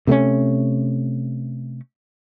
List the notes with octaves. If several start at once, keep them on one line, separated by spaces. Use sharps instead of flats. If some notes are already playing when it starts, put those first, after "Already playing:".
C3 A3 A#3 C#4